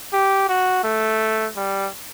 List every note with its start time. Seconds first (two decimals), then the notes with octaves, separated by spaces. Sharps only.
0.13 G4
0.48 F#4
0.84 A3
1.56 G3